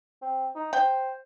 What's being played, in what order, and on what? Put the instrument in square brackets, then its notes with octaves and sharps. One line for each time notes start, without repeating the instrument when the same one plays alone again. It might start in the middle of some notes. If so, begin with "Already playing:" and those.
[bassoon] C4
D#4
[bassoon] C5 [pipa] G5